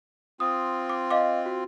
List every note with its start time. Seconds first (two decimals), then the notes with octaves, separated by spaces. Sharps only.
0.40 C4 F4 D#6
0.89 D6
1.10 D#5 F5 D6
1.46 F#4